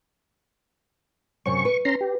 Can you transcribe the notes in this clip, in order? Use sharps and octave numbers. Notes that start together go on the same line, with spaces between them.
F#2 C3 C#5 C#6
B4
C#4 A#5 C6
G4